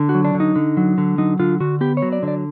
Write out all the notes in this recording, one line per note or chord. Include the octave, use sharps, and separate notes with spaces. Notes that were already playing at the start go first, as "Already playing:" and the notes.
Already playing: D3
F#4
F#3
D4
D3
D#4
D3
F#3
D3
F#3 D#4
D3 F4
D3 F#4
B3 G4
C#5
F#3
D5
D3
D5